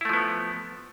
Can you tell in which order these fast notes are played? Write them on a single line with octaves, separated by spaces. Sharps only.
E4 A3 F3 B3